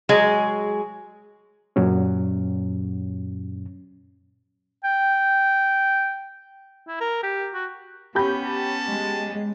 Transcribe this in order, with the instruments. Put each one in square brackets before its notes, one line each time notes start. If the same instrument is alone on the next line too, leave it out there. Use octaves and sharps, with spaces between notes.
[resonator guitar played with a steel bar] F#3 G#3 G#4
[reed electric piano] F#2 A#2 F#3 C#4
[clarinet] G5
[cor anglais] E4
A#4
G4
F#4
[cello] B3 C#4 [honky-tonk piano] G4 B5 G6
[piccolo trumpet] A5
[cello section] G#3